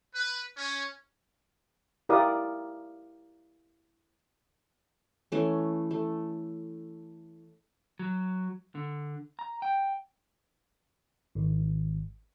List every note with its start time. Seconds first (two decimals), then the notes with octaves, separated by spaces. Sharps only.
0.14 B4
0.57 C#4
2.09 E4 G4 A#4 D5 F5 D#6
5.32 E3 A3 C#4
5.91 A3
7.99 F#3
8.75 D3
9.39 A#5
9.62 G5
11.35 G#1